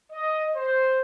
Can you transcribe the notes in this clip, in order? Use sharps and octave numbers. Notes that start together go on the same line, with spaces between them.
D#5
C5